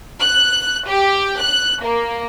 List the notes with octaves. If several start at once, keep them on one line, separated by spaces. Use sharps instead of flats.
F#6
G4
F#6
A#3